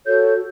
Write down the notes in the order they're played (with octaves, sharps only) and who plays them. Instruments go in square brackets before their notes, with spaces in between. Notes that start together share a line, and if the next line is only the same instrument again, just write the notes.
[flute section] F#4 A4 C#5 G6